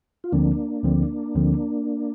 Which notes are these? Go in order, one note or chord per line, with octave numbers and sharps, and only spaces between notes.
F4
D2 D3 F3 A#3 C4 D4
D2 D3 F3 C4
D2 D3 F3 C4